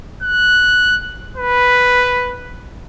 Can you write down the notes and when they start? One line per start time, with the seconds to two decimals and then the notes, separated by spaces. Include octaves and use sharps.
0.23 F#6
1.37 B4